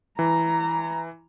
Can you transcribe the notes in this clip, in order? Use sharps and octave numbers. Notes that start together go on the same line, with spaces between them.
E3 A#5